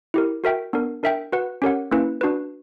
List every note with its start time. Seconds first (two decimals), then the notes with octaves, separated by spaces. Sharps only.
0.14 E4 G4 A#4
0.44 F#4 A#4 E5 G5
0.73 B3 D4 A#4
1.03 D4 A#4 E5 G5
1.32 F#4 B4 F#5
1.62 C#4 G4 A#4 C#5 F#5
1.91 A#3 C#4 E4 B4
2.21 D4 F#4 B4